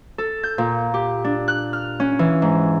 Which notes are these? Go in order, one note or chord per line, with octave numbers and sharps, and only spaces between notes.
A4
G6
A#2
G4
D4
F#6
F6
C#4
E3
G#2